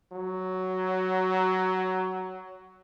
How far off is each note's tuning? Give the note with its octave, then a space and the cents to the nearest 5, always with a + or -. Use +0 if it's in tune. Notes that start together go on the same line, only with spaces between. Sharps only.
F#3 +10